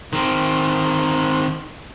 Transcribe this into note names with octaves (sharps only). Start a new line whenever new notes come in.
D#3 C4